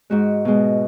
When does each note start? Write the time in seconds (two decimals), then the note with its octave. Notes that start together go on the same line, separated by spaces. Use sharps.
0.10 G#2 G#3 F#4
0.45 B2 G#3